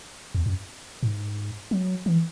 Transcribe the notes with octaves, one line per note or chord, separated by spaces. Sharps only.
E2
F#2
G#2
F#3
E3